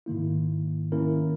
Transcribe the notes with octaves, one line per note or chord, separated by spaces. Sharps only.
G#2 D#3 A#3 E4
D#3 A#3 C#4 E4 A#4